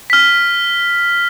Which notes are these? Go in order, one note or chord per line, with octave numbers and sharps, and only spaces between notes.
F6 B6